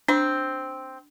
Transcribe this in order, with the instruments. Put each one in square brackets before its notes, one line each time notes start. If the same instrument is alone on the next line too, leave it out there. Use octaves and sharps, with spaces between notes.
[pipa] C4 [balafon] D4